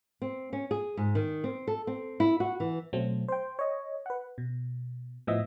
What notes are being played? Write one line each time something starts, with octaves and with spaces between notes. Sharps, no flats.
C4
C#4
G#4
G#2
D#3
C4
A4
C4
E4
F#4
E3
B2 F#3 A3 C4
C5 G5
C#5 D#5
B4 F#5
B2
A2 F3 B3 D#5 E5